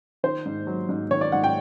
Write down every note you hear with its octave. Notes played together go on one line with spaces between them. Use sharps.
D#3 C5
G#2
F#3
G#2
D#3 C#5
D5
G#2 F#5
G5